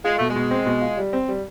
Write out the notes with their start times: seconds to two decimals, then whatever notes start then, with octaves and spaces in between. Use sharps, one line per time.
0.04 G#3 F4
0.18 B2 A3
0.30 G#3
0.36 B2
0.51 C4
0.66 B2
0.81 F4
0.97 G3
1.13 C4
1.28 G3